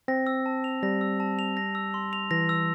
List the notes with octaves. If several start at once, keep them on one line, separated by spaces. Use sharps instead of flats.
C4 A#6
E6
A5
F7
G3 A#6
E6
A5
F7
A#6
E6
C6
F7
E3 A#6
E6